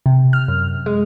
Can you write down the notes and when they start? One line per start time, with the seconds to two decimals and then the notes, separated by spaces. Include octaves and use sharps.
0.06 C3
0.33 F6
0.48 F#2
0.86 G#3